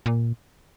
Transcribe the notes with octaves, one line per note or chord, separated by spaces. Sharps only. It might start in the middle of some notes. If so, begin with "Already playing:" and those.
A#2